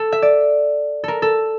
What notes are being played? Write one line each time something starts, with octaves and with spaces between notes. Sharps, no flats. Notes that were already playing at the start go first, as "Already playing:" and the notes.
Already playing: A4
E5
D5
A4 A#4
A4